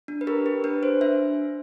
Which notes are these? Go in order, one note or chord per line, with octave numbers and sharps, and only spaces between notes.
D4
B4
G4 A#4
G4
D4 B4
D4 C5
D4 E5